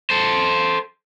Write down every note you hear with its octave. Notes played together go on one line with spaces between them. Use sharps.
A4 C5